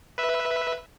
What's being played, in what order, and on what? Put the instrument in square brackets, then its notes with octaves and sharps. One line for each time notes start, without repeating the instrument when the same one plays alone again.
[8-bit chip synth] B4 E5